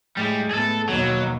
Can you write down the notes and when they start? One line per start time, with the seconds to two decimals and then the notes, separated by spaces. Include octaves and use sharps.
0.17 A2 G3 G#3
0.51 A2 B3 G#4 A4
0.89 D#2 B2 F#3